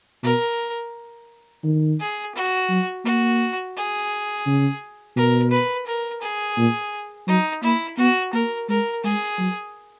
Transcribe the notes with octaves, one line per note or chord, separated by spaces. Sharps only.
B2 A#4
D#3
G#4
F#4
F#3
A#3 F#4
G#4
C#3
B2 A#4
B4
A#4
G#4
A#2
F#3 D#4
A#3 E4
B3 F#4
A#3 A#4
G#3 A#4
G#3 G#4
F#3